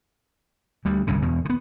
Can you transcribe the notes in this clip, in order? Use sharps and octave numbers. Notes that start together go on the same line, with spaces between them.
D2 G3
G1 C2 F#2 C#3
E2 B2
D3 B3